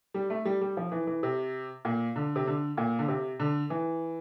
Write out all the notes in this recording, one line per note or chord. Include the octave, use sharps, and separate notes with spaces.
G3
A3
G3
G3
F3
E3
E3
C3
A#2
D3
C3
D3
A#2
D3
C3
D3
E3